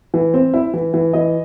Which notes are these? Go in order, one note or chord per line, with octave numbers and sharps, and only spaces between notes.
E3
C4
E4
E3
E3
E3 D#5